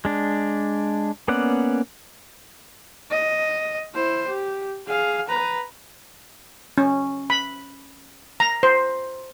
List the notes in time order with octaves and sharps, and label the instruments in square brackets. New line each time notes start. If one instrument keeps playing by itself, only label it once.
[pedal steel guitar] G#3 D4
A#3 B3 C#4 D5 F#5
[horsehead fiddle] D#5
E4 C5
G4
G#4 F5
B4 A#5
[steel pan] C#4
B5
A#5
C5